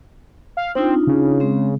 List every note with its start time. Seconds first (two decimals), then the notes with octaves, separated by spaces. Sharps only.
0.57 F5
0.75 C4 D4 D#4 F4
1.07 C#3
1.40 G#3 C4